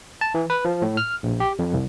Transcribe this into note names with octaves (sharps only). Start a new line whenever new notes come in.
A5
E3
B4
F3
A2
F6
A#1
G4
F2
C2